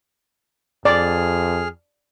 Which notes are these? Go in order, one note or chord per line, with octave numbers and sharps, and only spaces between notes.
F2 G#4 D5 F6